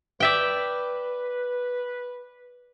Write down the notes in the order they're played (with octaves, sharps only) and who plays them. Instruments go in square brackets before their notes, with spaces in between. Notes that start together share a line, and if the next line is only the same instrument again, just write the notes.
[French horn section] B4 [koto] D5 E5 G5